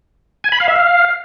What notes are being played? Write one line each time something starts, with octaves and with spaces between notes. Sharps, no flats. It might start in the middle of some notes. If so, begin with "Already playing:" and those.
G#5
B5
F5
E5
F5